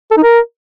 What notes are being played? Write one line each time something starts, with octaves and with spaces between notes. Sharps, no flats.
A4
D#4
A#4